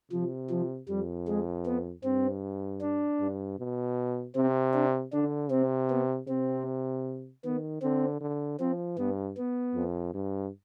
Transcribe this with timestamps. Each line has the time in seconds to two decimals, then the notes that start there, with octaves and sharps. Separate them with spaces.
0.12 C3 F3
0.50 F3
0.88 F2 G3
1.28 G#3
1.66 B3
2.04 G2 C4
2.81 D4
3.20 G2
3.59 B2
4.36 C3 C4
4.74 D4
5.13 D3 D4
5.51 C3 C4
5.90 B3
6.28 C3 C4
7.45 D#3 B3
7.82 D3 C4
8.21 D3
8.60 F3 C4
8.98 G2 B3
9.37 B3
9.75 F2
10.14 G2